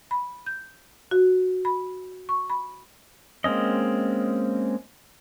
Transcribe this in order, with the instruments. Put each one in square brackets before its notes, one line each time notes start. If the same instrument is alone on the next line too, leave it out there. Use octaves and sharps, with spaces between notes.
[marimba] B5
G6
F#4
B5
C#6
B5
[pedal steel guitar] G#3 A#3 C4 C#4 D#5